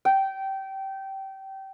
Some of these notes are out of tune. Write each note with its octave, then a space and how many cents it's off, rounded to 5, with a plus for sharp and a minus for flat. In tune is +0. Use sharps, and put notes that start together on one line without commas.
G5 -20